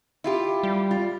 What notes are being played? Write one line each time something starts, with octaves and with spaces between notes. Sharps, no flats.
E4 F4 G4
G3
F4